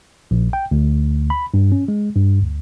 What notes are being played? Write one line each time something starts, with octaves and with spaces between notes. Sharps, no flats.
A#1
G5
D2
B5
G2
C#4
G#3
G2
D2